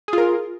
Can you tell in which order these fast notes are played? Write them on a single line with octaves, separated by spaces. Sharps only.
G#4 F4 A#4